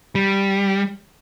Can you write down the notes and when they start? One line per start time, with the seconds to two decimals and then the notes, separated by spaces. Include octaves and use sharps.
0.15 G3